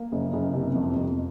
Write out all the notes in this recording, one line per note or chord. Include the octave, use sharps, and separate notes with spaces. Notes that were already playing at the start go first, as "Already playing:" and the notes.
Already playing: A#3
F#1
F#1
C3
F2
F2